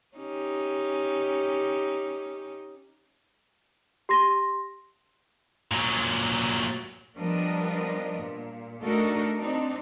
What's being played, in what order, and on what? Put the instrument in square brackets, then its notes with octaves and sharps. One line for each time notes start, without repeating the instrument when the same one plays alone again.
[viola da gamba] C#4 D#4 G4
[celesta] G4 C6 A#6
[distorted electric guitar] A#2 F#3
[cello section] F3 G3 B3 D4 A#4 D#5
A#2
A3 D4 D#4 F#4 A4 A#4
C4 D4 D#4